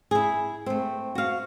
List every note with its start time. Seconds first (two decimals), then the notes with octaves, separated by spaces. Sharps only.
0.11 E4 G#4
0.66 A3 C4
1.15 F#4 F5